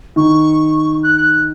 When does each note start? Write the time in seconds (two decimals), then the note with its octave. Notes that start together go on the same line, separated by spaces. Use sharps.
0.16 D#3 C#6
1.03 F#6
1.17 F#6